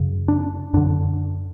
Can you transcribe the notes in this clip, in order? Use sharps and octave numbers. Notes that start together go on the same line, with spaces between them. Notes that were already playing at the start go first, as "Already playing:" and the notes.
Already playing: F#2 C#3
D4
F#2 D3 D4